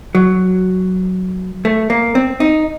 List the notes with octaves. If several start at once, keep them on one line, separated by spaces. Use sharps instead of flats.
F#3
A3
A#3
C4
D#4